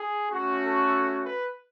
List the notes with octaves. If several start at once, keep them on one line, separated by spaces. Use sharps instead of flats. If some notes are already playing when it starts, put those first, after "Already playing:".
Already playing: G#4
A3 C#4 F#4
A4
B4